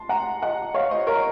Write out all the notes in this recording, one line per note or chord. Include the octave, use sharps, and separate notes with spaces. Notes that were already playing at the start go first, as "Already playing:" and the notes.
Already playing: A5 C6
F#5 A#5
D#5 F#5
C#5 F5
C5 D#5
A#4 C#5